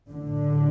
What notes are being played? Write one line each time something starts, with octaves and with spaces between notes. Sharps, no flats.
A2 D3